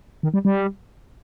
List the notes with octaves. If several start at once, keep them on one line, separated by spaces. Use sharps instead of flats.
D#3
G3
G3